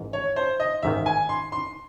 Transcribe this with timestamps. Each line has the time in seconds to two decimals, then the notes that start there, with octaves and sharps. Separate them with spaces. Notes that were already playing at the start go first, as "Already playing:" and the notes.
Already playing: A1 G#2 D#3
0.13 C#5
0.36 C5
0.60 D#5
0.83 A1 G#2 D#3 E5
1.06 G#5
1.29 C6
1.52 C6